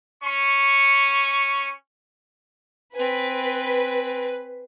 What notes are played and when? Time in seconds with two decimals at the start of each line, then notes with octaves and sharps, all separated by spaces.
0.23 C#4 C#6
2.95 C4 B4 G#5